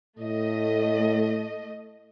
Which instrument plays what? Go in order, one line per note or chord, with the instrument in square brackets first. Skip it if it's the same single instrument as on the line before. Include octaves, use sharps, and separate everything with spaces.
[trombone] A2 [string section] A3 D#5